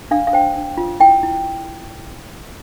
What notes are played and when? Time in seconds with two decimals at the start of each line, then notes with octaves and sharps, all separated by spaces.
0.11 D4 F5
0.27 F5
0.33 C5 G5
0.56 D4
0.77 F4
1.00 E4 G5
1.23 E4